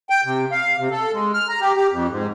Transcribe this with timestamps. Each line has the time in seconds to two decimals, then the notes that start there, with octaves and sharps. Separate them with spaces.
0.10 G5
0.25 C3
0.51 F5
0.78 C3
0.91 A4
1.13 G#3
1.34 F6
1.48 A#5
1.61 G4
1.76 G4
1.91 F2
2.10 G#2